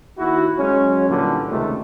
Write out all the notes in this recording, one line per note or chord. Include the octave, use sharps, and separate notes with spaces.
D#2 E4 F#4
F#3 G#3 C#4
A#2 D3 E3 G3
C#2 C3 D#3 A3